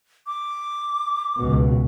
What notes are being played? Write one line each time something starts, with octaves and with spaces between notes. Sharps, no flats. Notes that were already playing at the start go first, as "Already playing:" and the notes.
D6
C#2 B2